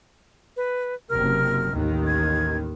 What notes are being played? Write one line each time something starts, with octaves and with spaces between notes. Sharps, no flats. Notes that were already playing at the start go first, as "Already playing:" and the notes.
B4
F#1 C3 A#4 F6
A1 D#2 D#3
G#6